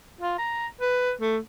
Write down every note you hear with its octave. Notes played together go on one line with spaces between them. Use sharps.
F4
A#5
B4
A3